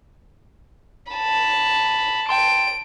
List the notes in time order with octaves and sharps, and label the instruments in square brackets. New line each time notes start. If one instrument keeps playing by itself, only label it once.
[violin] A5 B5
[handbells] G5 A5 C6 [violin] D7